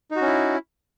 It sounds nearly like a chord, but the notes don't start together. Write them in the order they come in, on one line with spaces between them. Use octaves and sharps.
D#4 F#4 C#4 E4